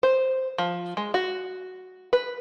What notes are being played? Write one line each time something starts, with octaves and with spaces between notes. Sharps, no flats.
C5
F3
G#3
F#4
B4